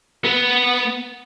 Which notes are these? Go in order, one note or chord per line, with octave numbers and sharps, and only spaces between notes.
B3